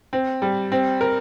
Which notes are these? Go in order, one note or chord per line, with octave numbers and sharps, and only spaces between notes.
C4
G3
C4
A#4